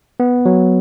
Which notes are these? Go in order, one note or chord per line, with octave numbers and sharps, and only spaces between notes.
B3
F#3